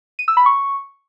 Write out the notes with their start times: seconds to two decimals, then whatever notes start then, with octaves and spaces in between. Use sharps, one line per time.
0.19 D#7
0.28 E6
0.37 B5
0.46 C#6